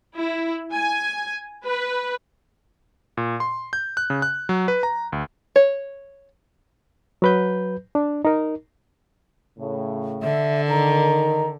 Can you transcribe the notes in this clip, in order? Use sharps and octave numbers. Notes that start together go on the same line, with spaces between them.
E4
G#5
B4
A#2
C6
G6
F#6
C#3
F#6
F#3
B4
A#5
D2
C#5
F#3 B4 G6
D4
D#4 A#4
A2 C#3
D3 E5
D#3 A#5